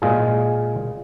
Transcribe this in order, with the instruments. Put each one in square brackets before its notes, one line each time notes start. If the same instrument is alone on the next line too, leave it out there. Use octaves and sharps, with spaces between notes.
[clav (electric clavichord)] A#2 G#3 F4 G#4